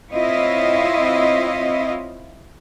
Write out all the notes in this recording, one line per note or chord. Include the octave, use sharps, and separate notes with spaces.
C4 E4 F4 C#5 D#5